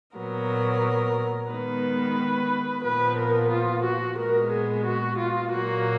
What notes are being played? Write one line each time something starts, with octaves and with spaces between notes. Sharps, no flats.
A#2 F#3 B3 A#4
D#3 G#3 B3 B4
A#2 F3 B3 B4
A#4
F4
F#4
A#2 G#3 B3 A#4
G#4
F#4
F4
A#2 F#3 A#3 F#4